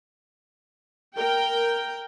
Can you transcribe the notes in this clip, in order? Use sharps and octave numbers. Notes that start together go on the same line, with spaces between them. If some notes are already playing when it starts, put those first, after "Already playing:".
A#4 G5